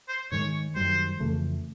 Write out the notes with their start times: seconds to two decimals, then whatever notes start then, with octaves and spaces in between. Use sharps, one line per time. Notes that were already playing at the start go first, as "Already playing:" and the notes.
0.09 C5
0.32 G#2 D#3 G#3 C#5
0.75 F#2 D#3 G3 C5
1.20 F2 C#3 E3 A3